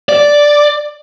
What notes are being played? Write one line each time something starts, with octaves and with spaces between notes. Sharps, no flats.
D5